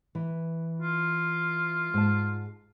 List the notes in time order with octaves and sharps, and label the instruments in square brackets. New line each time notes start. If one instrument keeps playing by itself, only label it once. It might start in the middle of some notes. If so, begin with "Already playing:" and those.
[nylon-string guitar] E3
[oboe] F4
[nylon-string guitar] G#2 A5